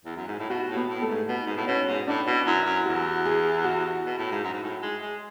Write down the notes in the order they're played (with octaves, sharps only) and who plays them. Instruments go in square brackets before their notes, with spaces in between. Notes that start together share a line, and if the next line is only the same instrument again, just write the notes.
[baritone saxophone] E2
F#2
G#2
A2
[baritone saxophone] B2 [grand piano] F#4
[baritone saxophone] A2
[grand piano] B3
[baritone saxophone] A2
[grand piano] A3
[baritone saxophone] G#2
[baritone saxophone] B2 [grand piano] B3
[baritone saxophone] G#2
A2
[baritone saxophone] B2 [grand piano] C#4
[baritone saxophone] G#2
[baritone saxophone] A2 [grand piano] D4
[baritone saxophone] B2
[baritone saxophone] F#2 [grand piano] E4
[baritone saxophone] F#2
[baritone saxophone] E2 [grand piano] F#4
[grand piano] G#4
F#4
[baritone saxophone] B2
A2
G#2
F#2
G#2
A2
G#3
G#3